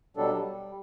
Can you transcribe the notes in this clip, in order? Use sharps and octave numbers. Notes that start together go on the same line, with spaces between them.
B2 F#3 G3 D4 A4
G3